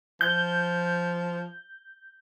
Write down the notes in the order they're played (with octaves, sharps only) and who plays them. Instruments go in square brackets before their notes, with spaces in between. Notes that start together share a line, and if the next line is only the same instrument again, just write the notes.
[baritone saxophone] F3 [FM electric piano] G6